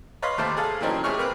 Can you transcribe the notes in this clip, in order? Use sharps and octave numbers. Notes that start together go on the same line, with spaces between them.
B4 C#5 D#5 F5 B5 C6
D#2 C3 A3 C5 A5
G#4 A4 F5
A#2 E3 F#3 C4 C#4 D#4
C3 A3 G#4 C#5 C#6 F6
A#3 C4 B4